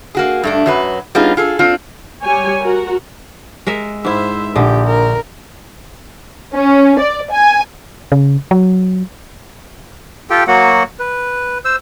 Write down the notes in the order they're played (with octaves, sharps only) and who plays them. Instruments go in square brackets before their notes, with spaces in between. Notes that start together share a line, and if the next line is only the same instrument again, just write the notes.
[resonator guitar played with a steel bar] A#3 F#4 G#4
G2 A3 D4
F#2 F#3 B4
G3 B3 C#4 D#4 F4 G#4
F4 G#4 A4
C4 D4 F4
[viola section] G3 G4 C#5 G#5
F#4 A#4
[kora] G#3 A#4 E5
[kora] G#2 E4 [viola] C5 E5
[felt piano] A#1 [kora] D3 [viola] G4
[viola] A#4
[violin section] C#4
D5
G#5
[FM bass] C#3
F#3
[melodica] F4 G4 A4 G5
F#3 A#3 F#4 F#5
B4
C5 E6